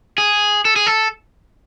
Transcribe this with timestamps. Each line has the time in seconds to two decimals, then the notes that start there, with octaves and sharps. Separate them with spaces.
0.18 G#4
0.65 A4
0.76 G#4
0.87 A4